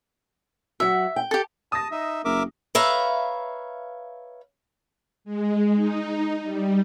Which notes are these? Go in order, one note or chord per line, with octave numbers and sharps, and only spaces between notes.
F#3 F#4 E5
G5
G4 A4
A5 D#6 A#6
D#4 E5
F#1 A#4 E5 D6
B4 C#5 E5 F5 A#5
G#3
D#4
G3